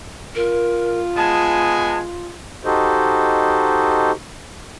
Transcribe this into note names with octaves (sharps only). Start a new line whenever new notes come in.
F4 A#4
G#3 B3 G#5 A5
D#4 F#4 G4 A4 C5 D#5